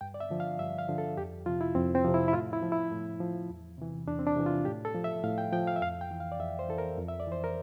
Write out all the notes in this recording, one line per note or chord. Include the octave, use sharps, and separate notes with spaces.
G2 G5
D5
E5
D3 F3
F5
G2 E5
F5
D3 F3
A4
F2 G4
C3 F3 F4
E4
F2 C4
C4
C3 F3
E4
E4
A2 F4
E4
F3
E4
A2
F3
E2
C3 E3
E2 D4
C4
D4
C3 E3
F4
A2 G4
A4
F3
E5
A2 F5
G5
F3 G5
F5
E5
F2 F5
G5
E3
F5
D5
F2 E5
C5
E3 A4
A#4
F2
E5
D5
E3 C5
A#4